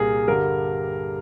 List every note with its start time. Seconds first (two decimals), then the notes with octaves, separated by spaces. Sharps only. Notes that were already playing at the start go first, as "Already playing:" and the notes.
Already playing: C2 A#2 G3 G#4 A#4
0.28 G2 D3 G3 A#4